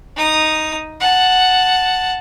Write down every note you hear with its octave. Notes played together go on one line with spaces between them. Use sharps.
D#4 D#6
F#5 A5